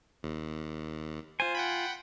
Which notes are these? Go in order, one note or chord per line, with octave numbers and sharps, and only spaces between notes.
D#2
F4 C5 G#5
F#5 G5 B5